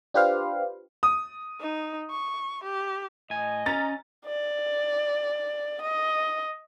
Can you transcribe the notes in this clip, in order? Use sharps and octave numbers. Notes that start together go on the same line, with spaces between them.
D4 F4 G4 B4 C5 F5
D#6
D#4
C#6
G4
A2 D#5 G#5
C#4 A#5 A6
D5
D#5